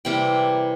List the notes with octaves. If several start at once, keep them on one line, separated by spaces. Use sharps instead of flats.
C3 E3 G3 A#3 G5